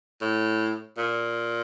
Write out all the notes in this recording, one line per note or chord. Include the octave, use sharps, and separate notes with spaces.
A2
A#2